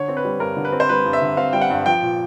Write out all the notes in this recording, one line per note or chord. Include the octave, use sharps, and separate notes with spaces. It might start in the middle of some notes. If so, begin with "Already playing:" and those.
Already playing: D3 C#5
C4
B4
G3
G2 A#4
D3
B4
C4
C5
G3 B4
G2
E5
D3
C4 F5
G3 G5
F#5
G2
F3 G5
A#2